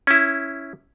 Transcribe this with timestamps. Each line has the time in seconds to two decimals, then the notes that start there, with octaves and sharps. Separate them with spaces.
0.07 C#4 E4